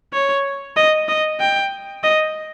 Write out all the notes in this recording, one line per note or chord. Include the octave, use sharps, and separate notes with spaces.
C#5
D#5
D#5
G5
D#5